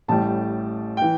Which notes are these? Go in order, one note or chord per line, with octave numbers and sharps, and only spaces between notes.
A1 A2 G3 A5
E3 G5